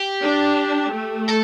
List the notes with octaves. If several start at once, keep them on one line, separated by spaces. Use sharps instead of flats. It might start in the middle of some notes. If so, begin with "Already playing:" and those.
Already playing: G4
D4
A3
A4